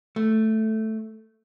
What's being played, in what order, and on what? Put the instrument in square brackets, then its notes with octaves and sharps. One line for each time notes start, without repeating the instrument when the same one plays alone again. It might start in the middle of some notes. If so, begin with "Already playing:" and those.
[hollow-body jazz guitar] A3